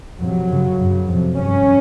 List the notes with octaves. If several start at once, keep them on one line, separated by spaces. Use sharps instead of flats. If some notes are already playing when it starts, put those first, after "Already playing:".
F2 C3 F#3
F#2 C#3
F#2 C#3
F2 C3
G2 C#4